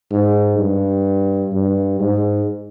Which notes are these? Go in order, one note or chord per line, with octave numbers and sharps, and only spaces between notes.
G#2
G2
G2
G#2